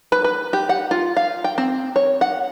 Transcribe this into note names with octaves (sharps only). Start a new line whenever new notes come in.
B4
B4
G4
F#5
F4
F5
G5
C4
C#5
F#5